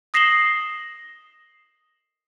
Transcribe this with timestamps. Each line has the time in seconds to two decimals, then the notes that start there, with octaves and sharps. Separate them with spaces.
0.14 D#6 A#6 C7 E7 F#7 G7